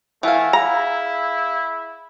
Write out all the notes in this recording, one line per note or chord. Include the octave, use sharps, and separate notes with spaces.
E3 A3 F5 F#5 G#5
E4 G#4 F5 A#5